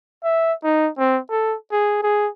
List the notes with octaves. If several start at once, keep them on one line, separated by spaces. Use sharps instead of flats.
E5
D#4
C4
A4
G#4
G#4